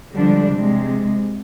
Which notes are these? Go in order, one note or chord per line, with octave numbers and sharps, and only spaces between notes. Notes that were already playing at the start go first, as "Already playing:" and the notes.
D3 F3 G3 G#3 D4
C3 G#3